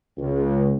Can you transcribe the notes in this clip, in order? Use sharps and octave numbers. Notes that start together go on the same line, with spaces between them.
C#2